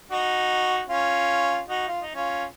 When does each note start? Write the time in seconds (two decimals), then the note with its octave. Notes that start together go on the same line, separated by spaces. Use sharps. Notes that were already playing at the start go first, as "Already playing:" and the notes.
0.11 D#4 F#4
0.89 C#4 F4
1.69 D#4 F#4
1.88 F4
2.02 D#4
2.15 C#4 F4